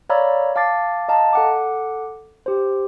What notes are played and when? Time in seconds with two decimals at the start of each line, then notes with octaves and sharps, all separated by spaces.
0.10 C#5 D5 F5 A#5 B5 E6
0.56 F5 A5 D6 A6 C7
1.08 D#5 F5 A5 A#5
1.33 A4 F#5 D6
2.46 G4 C5